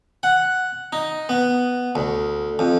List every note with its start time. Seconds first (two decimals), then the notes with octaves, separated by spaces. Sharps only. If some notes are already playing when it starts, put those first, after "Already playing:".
0.23 F#5
0.93 D#4
1.29 B3
1.95 D2
2.59 F2